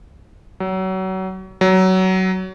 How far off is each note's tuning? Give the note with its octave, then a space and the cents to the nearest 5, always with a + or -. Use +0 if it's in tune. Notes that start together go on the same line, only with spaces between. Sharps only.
F#3 +30
F#3 +20